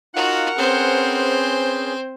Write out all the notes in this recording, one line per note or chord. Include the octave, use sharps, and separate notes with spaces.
D#4 F4 F#4 A#4 F5 F#5
C4 C#4 G#4 B4 C5